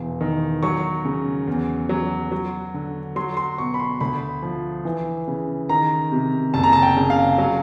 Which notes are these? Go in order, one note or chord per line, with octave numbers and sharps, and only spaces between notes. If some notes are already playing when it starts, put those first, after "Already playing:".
Already playing: E1 E3
D#3
F#3 C#6
C#3
E2
F#3
F#3
D3
F#3 C6
C6
B2 C#6
B5
C6
D2 B5
F3
E3
C#3
D#3 A#5
C3
F#1 A5
A#5
A5
G5
C#3
F5
F#3